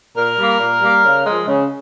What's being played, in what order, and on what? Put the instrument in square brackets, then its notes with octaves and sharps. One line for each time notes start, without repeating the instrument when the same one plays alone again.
[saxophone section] A#2 A#4
G3 A#3
A#2
G3 A#3
C#3
F3 G#3
C#3